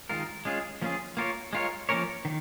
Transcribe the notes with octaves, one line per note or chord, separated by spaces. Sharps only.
D#3 G#3 F4 A#4
G#3 C#4 F4 G#4
F3 A#3 C#4 F4 G#4
A#3 F4 A#4 C#5
G#3 F4 A#4 C#5
F3 A#3 C#4 A#4 C#5
D#3